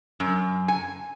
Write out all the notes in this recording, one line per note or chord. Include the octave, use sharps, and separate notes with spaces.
F#2
G#5